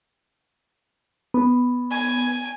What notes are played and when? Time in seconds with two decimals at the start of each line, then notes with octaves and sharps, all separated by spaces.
1.34 B3
1.91 G#5